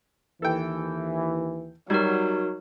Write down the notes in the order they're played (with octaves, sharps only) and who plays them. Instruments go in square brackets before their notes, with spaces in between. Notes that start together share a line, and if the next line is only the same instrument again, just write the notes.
[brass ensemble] D#2 E3 [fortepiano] A4 G5
[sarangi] F#3 [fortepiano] G3 [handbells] D#4 F#4 A#4